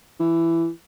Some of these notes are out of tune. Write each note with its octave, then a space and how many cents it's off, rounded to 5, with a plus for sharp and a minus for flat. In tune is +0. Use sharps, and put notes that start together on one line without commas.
E3 +15